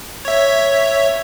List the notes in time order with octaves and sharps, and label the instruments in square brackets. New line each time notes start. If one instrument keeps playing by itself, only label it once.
[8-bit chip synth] C#5 E5